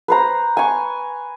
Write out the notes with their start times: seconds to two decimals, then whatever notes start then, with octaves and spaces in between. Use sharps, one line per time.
0.08 B4 C5 A#5
0.57 G#5 C#6